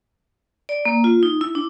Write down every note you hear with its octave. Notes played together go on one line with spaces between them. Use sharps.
D5
A#3
F4
D#4
E4
D4